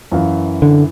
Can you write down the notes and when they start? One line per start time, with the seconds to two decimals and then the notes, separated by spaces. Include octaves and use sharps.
0.12 F#2 E3 F5
0.62 D3